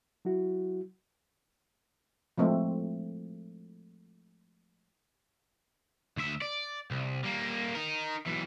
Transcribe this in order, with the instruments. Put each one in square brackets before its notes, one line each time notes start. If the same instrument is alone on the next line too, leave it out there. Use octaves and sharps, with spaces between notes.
[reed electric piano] F#3 E4 F#4
[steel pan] F3 G#3 A3 C4
[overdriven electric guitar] D2 E5
D5
C2
G3 A#3
D#4 A#4
B1 E3